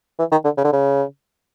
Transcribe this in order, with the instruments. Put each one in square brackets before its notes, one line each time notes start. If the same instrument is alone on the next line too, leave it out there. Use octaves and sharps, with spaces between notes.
[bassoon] E3
D#3
D3
C#3
D3
C#3